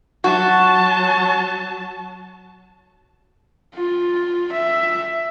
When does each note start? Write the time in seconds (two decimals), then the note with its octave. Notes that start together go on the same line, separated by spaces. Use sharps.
0.24 F#3 F#4 A5
3.75 F4
4.53 E5